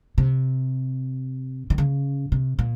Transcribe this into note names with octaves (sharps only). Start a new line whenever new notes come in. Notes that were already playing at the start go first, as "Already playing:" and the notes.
C3
D#3
C#3
C3
A#2